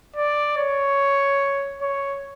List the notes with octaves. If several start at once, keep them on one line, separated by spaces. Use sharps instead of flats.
D5
C#5
C#5